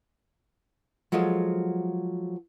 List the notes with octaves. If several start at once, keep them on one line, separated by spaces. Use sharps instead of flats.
F3 F#3 G#3 F4 G#4 A4